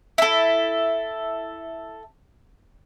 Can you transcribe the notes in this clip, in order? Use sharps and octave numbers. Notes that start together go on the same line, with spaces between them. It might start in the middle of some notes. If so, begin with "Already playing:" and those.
E4 A4